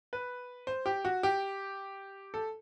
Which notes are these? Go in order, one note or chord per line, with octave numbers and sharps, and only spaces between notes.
B4
C5
G4
F#4
G4
A4